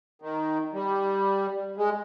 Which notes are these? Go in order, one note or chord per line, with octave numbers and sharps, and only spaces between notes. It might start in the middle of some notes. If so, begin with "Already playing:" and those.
D#3
G3
G#3